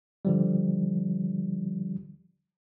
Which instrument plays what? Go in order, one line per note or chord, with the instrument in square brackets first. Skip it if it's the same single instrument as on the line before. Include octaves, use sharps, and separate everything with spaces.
[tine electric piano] D3 F3 G3